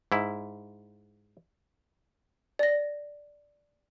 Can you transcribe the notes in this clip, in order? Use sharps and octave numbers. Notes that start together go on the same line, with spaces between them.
G#2 E4
D5 A#6